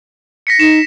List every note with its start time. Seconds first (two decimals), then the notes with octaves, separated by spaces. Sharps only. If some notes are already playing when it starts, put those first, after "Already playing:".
0.47 A#6 B6 C#7
0.60 D#4 E7